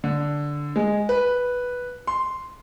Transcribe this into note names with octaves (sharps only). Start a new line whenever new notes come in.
D3
G#3
B4
C6